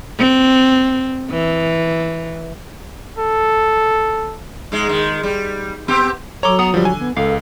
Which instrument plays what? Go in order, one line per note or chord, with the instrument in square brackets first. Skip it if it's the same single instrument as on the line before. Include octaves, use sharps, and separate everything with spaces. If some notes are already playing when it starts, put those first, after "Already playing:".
[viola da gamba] C4
E3
[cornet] A4
[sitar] G#2 G#3
D#3 G#3
G3
B3 C4 G4
[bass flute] F#3 [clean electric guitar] A4 A#5 [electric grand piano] C#5 D6
[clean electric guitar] B3 F#5 A#5 [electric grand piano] D#6
[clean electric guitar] D3 [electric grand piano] F3 G3
[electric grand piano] G#5
[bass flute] B3
[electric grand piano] C#2 [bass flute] A4 [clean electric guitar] F5